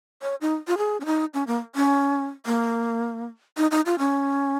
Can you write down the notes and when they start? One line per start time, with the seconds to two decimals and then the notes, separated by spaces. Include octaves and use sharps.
0.22 C#5
0.41 D#4
0.67 F4
0.78 G#4
1.01 C#4
1.06 D#4
1.34 C#4
1.47 A#3
1.76 C#4
2.46 A#3
3.57 D#4
3.71 D#4
3.86 F4
3.99 C#4